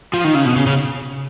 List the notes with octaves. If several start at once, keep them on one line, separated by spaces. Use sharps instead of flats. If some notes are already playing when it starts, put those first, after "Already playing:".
F3
D#3
C#3
B2
C#3
C#3